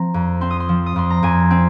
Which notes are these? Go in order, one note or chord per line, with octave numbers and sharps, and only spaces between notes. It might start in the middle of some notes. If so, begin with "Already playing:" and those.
Already playing: F3 C4 A#5
F2
C4 C6
D#6
C6
F3
D#6
F2 C6
A#5
F2 G#5
C4